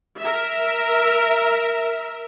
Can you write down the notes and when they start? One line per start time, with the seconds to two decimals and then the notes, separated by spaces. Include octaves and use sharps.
0.19 A#4 E5